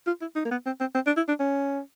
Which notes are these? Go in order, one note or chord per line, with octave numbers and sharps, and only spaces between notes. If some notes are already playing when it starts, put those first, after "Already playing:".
F4
E4
D#4
A#3
B3
C4
C4
C4
D4
E4
D4
C#4